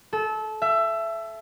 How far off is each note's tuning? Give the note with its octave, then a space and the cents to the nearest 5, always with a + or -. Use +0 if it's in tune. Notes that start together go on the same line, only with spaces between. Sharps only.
A4 -25
E5 +20